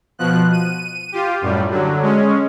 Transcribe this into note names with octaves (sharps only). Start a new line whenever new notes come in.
B2 F3 F#6
D#7
F4 G4
F#2 A2 G3
D3 F#3
G#3 C#4